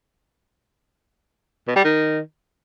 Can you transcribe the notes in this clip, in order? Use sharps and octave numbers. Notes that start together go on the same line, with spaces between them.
B2
G3
D#3